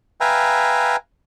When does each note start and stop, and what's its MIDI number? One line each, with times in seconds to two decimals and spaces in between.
0.21 0.96 71
0.21 0.96 76
0.21 0.96 77
0.21 0.96 79
0.21 0.96 80
0.21 0.96 82